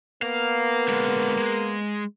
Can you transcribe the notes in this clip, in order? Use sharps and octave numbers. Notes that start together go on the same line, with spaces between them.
A#3 B3 F5
D3 G#3
G#3